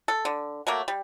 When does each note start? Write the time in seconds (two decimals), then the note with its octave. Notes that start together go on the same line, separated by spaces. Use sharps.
0.08 A4
0.25 D3
0.67 F#3 A3 A#3
0.88 G3